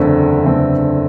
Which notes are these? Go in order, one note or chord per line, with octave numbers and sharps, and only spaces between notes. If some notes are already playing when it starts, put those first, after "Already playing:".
Already playing: F#1 E2 D3 A3 C4
F#1 E2 D3 A3 C4